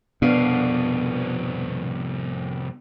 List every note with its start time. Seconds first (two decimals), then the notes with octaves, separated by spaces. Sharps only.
0.22 C2 F2 B2 B3 D4 F5